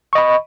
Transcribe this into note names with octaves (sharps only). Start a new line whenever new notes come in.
D#5 B5 C#6